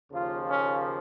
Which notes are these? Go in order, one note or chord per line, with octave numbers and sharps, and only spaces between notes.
D#2 C#3 F3 A#3 F4
C#4